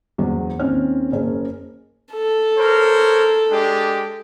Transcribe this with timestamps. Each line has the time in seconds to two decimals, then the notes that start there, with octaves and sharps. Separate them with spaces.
0.18 F#1 E2 F#3
0.59 D#2 D#3 C4 C#4 F6
1.12 F#1 C#4 G#4 A#4
2.13 A4
2.57 A#4 C5 C#5
3.50 G#3 D4 G4